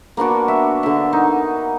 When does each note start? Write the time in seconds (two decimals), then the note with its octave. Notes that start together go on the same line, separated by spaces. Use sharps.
0.17 A#3 B3 D4 F#4
0.48 E5
0.83 D3 E5
1.13 D#4